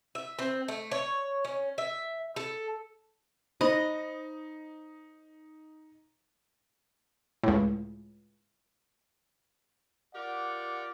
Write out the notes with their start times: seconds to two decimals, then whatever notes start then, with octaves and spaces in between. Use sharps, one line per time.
0.15 E5
0.39 C4
0.68 A3
0.91 C#5
1.45 C#4
1.78 E5
2.36 A4
3.61 D#4 C5 D#5 B5
7.43 C#2 A2
10.14 F4 G4 A#4 D5 F#5